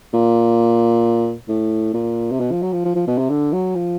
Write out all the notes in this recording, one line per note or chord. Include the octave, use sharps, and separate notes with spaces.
A#2
A2
A#2
C3
B2
F3
F#3
F3
F3
F3
B2
C3
D3
F#3
F3